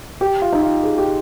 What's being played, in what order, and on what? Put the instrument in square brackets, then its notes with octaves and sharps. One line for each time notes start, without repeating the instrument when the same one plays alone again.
[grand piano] G4
F4
D#4
F4
G#4
G4